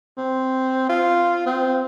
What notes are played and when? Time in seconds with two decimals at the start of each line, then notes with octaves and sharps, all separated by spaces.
0.17 C4
0.89 F4
1.46 C4